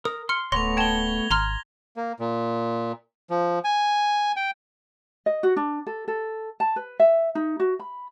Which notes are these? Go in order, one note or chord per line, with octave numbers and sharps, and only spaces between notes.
A#4 D#6
C6 F6 C#7
D1 A3 B3 C#5 C6 A#6 F7
G5 A5 G#6 G7
G#1 A#5 C6 F6
A#3
A#2
F3
G#5
G5
D#5
F#4
D4
A4
A4
A5
B4
E5
D#4
F#4
B5